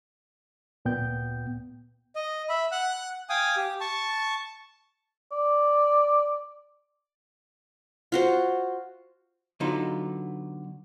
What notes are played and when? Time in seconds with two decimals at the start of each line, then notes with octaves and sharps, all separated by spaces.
0.85 D2 A#2 B3 G5 G6
2.16 D#5
2.49 E5 B5
2.72 F#5 F#6
3.30 F5 G5 G#5 D#6
3.56 G4
3.81 A5 C#6
5.32 D5
8.12 F4 F#4 C5
9.60 D3 F#3 B3 D#4 F4